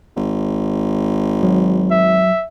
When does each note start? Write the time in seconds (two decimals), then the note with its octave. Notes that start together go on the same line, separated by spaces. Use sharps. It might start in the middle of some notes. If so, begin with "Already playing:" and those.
0.16 G#1
1.43 F#3
1.91 E5